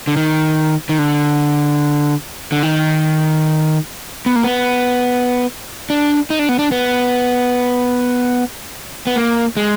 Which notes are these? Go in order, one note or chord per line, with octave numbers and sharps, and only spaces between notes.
D3
D#3
D#3
D3
D3
D#3
B3
A#3
B3
D4
D#4
D4
B3
D4
B3
B3
A#3
G#3